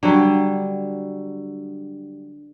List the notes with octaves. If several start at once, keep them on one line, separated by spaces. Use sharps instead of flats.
D3 F#3 G3